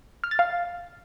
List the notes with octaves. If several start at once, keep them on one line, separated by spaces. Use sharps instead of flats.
F6
A6
F5